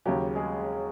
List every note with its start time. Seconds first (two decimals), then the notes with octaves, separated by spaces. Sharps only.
0.06 D#2 C#3 F#3 G4
0.36 G#3 G#4